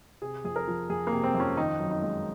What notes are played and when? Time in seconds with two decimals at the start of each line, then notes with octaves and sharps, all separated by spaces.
0.22 C3 G#4
0.45 F2 G#4
0.56 A#4
0.68 F3
0.89 F2 G#4
1.07 A#3
1.12 C3
1.23 C4
1.35 F2
1.40 C#4
1.57 D#3 D#4
1.80 F#2
1.91 D#4
2.02 G#3